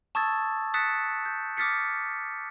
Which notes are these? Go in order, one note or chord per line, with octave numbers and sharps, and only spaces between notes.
A5 C#6 D#6 E6 G#6 A6
D#6 F#6 A6 B6 C#7 E7
G6
D6 D#6 F6 A6 B6 C#7